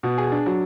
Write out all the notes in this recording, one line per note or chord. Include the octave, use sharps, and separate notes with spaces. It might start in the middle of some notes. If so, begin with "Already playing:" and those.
B2
G#4
D4
F#3